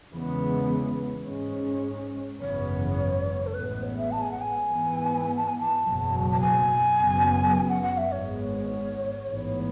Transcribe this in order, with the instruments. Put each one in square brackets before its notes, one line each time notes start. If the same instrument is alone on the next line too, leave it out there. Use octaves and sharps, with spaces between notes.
[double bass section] E2 C#3 E3 G#3 B3
G#2 G#3 C#4
[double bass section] G#1 F#2 C#3 E3 B3 [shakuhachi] C#5
[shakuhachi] A4
[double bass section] A1 A2 G#3 B3 [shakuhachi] B4
[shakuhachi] B4
C#5
E5
A5
G#5
F#5
G#5
[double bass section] G#2 E3 B3
[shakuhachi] A5
G#5
A5
[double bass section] F#1 E2 B2 F#3
[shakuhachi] A5
G#5
[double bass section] F#1 F#2 C#3 F#3 B3
[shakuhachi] F#5
F#5
E5
[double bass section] G#1 G#2 G#3 B3 [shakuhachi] C#5
[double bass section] A1 G#2 E3 B3